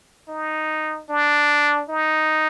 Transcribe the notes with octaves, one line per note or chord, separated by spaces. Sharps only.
D#4
D4
D#4